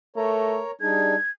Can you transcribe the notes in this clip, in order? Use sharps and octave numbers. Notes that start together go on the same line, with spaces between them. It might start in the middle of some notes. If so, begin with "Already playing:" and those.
A3 A#4 C#5 A#5
G3 D4 D#4 G#4 G#6